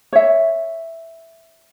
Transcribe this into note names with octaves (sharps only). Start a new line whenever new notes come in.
C#5 E5